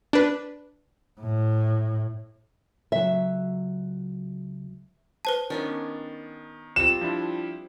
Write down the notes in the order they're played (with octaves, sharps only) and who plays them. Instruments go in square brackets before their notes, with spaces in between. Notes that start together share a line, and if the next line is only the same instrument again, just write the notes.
[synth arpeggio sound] D4 B4
[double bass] A2
[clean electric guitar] C#2 F#3 [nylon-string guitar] E5
[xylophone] B4 C5 A5
[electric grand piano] D#3 [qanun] B3 C#4 D4
[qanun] G3 C4 F4 [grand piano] E7
[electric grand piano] F3 D4 E4